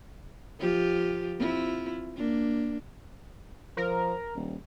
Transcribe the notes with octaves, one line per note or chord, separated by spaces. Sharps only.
F3 F4 G4
C4 E4 F4
A#3 D4
F3 A#4
D#1